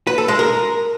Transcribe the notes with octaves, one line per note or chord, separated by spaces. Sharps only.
B4
A4
G#3
A#4